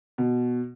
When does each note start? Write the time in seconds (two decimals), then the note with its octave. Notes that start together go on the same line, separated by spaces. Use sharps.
0.18 B2